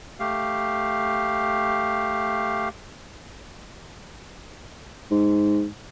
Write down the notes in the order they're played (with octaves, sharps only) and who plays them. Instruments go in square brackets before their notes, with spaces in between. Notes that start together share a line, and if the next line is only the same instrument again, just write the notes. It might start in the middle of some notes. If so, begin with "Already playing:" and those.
[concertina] A3 G4 F5
[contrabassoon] G#2